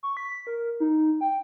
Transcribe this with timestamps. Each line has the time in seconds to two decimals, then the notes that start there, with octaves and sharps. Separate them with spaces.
0.03 C#6
0.17 B6
0.47 A#4
0.80 D#4
1.21 G5